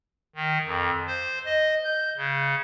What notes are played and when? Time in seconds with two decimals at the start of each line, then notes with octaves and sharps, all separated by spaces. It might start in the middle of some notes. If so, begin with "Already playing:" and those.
0.35 D#3
0.65 F2
1.07 C5
1.45 D#5
1.84 G6
2.18 C#3